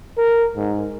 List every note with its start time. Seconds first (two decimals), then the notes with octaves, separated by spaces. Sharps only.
0.18 A#4
0.57 G#2